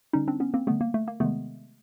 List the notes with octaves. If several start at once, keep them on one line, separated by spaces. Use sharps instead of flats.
D3 G3 C#4 D#4
C4 D4
B3 C#4
A#3 C4
D3 G3 A3 B3
A#3
A3
A#3
C3 D#3 G#3 A3 B3